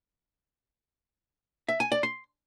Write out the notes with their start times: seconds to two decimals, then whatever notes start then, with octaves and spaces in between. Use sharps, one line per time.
1.69 E5
1.80 G#5
1.92 D5
2.03 C6